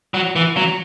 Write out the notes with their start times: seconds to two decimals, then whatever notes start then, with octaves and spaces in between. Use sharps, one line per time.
0.14 F#3
0.36 E3
0.57 F#3